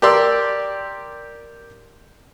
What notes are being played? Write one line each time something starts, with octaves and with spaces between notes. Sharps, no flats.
G4 A#4 D5 C6 E6